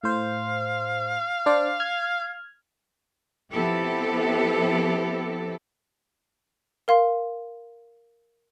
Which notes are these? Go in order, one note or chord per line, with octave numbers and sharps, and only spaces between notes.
A2 C5 F5
D4 C5 D5
F6 G#6
F3 B3 C4 E4 G4 A4
A#4 F5 C6